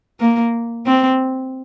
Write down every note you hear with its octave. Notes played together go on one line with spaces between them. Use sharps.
A#3
C4